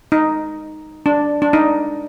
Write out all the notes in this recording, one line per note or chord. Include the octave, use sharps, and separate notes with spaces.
D#4
D4
D4
D#4